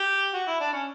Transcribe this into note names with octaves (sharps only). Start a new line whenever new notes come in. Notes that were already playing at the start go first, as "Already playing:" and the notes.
Already playing: G4
F#4
E4
D4
C#4